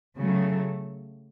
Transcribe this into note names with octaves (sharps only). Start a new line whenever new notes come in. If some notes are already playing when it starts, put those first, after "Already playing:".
C#3 F#3 A3